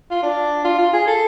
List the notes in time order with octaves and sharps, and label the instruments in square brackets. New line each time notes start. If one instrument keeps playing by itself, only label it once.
[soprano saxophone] F4
D4
F4
F4
G#4
A4